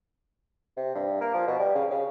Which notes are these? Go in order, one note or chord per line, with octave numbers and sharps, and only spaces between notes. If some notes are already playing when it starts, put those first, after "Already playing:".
C3
G2
A#3
F3
B2
G3
C#3
C#3